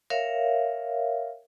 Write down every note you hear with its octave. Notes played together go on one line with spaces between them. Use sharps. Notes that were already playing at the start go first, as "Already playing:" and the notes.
A#4 C#5 E5 F5